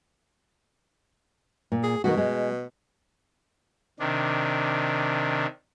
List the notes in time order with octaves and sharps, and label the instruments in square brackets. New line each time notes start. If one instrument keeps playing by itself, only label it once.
[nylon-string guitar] A#2
[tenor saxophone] G#4
[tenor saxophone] B2 [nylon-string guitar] D#3 G#3 F#4
[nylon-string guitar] G#3
[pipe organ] C3 D#3 D4